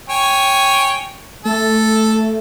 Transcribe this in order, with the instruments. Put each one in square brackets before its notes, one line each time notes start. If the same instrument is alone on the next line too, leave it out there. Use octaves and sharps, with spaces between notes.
[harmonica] C#5 G5 G#5
[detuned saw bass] A3 [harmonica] A4